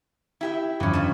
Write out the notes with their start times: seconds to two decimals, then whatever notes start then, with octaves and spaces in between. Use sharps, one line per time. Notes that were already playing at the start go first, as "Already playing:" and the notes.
0.41 E4 G4 E5
0.80 G1 F2 E3 C#4
0.93 A3 C#4